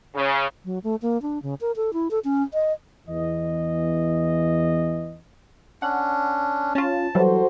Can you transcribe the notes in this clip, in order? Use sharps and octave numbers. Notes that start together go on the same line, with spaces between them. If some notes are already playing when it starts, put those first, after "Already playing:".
C#3
F#3
A3
A#3
D4
C#3
A#4
A4
E4
A4
C#4
D#5
E2 E3 D#5
C#4 D4 F#5
C#4 F4 A5
E3 F#3 G3 F#4 A4 C5